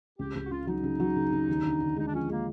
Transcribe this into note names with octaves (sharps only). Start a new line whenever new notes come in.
C#2 G4
C#2 G4
F#4
C#3 F4
F#3 D#4
C#3
F#3
C#3
C#3
D#2
D3
D3
G#3 D#4
D4
F3 C#4
G#3 A#3